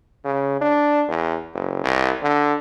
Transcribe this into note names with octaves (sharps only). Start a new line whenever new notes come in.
C#3
D4
E2
F#1
C2
D3